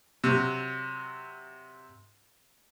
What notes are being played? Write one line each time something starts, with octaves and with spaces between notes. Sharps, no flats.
C3 F#3